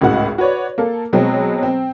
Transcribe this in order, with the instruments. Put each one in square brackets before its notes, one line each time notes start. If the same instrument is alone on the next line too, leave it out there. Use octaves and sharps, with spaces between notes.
[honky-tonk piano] G#1 C#2 A2 G#3 F#4 F#5
F#4 B4 C#5 D5
A#3 A4
B2 F#3 G#3 C4
C4